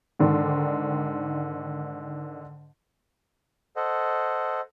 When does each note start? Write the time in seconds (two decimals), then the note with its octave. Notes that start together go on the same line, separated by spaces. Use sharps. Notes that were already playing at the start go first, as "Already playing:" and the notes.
0.19 G#2 D3 D#3 D5
3.76 A4 C5 D#5 F#5